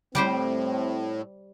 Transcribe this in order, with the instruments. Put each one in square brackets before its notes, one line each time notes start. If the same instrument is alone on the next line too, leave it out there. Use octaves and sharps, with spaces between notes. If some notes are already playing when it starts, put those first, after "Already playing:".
[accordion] A2 [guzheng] G3 G4 C5 [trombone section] C4